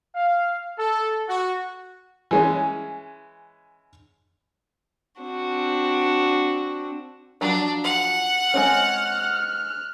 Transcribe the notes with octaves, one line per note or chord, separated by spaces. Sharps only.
F5
A4
F#4
E3 G#3 C#4
C4 D4 F#4
F3 F#3 D4
F#5
G#3 C4 C#4 F6 F#6